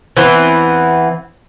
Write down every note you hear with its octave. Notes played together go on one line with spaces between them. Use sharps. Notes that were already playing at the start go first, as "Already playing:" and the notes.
E3 B3 C4